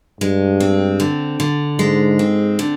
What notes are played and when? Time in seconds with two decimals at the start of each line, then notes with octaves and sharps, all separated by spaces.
0.21 G2 G#3
0.60 C4
1.00 D3
1.40 D3
1.79 G#2 G#3
2.19 C4
2.59 D3